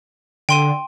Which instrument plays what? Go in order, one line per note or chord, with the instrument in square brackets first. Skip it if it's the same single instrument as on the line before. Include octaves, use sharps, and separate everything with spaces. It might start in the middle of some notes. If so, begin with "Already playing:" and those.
[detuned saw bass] D3 [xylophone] G5 C6 D#7